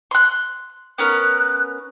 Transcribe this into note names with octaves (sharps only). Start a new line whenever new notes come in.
C6 F#6
B3 C#4 A#4 F#6